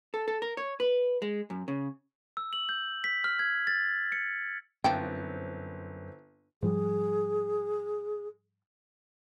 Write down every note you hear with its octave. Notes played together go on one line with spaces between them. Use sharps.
A4
A4
A#4
C#5
B4
G#3
F#2
C#3
E6
F#7
G6
B6
F6
G#6
A6
C#7
G1 F#2 E3 F3 C4 G5
G#2 F3 G3 G#4